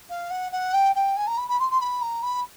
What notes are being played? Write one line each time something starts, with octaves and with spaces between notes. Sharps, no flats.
F5
F#5
F#5
G5
G5
G#5
A#5
B5
B5
C6
C6
B5
A#5
B5